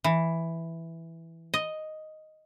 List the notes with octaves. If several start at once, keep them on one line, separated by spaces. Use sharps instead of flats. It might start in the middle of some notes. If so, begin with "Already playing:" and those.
E3
D#5